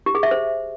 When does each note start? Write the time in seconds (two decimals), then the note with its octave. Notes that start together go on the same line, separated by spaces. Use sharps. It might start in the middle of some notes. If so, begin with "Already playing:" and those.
0.06 G4
0.15 G#4
0.23 E5
0.31 C5